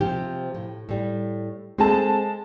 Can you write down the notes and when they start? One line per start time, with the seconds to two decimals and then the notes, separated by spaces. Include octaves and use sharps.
0.01 C3 F3 G4
0.54 A2
0.89 A2 G3
1.78 G#3 C4 G#4 A4 A5